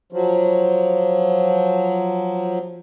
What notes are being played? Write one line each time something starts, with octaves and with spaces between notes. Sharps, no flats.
F3 F#3